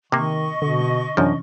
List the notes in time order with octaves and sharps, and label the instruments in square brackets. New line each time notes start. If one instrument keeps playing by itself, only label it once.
[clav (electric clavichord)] C3 A#3 [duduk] D#3 [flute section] D#5 C#6
[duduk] B2 [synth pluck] D3
[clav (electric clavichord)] F#2 F3 [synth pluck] C3 E3 C#4 [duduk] D4